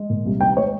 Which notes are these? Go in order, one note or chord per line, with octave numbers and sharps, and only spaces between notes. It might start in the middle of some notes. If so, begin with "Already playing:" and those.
Already playing: G#3
A#2
C2
D#2 G5
G#3 C#5